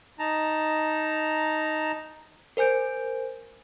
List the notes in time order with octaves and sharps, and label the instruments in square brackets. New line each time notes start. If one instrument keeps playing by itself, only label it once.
[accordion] D#4 A5 A#5
[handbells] A#4 C5 G#5 G6 D7